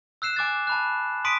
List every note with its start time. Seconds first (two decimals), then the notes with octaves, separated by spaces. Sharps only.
0.22 E6 F#6 C7 E7
0.36 G#5 D6 F#6 A6
0.67 A5 B5 F#6
1.25 C6 D#6 B6 D7 D#7